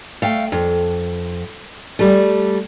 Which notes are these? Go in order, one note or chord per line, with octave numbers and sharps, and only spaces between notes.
A3 F5 G5
F2
G3 A3